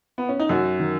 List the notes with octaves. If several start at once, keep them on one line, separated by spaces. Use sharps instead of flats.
B3
C#4
D#4
F#2 F#4
D#3